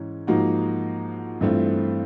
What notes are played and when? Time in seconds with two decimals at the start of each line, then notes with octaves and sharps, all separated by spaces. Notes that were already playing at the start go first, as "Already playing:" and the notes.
Already playing: G#2 E3 C#4
0.27 G#2 F3 A#3 D#4 F#4
1.41 G2 E3 A3 C4 F4